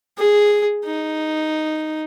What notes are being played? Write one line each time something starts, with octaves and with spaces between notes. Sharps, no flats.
G#4
D#4